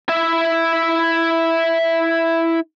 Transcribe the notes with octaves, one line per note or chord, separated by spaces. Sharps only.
E4 E5